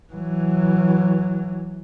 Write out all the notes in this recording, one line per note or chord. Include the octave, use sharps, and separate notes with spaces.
E3 F#3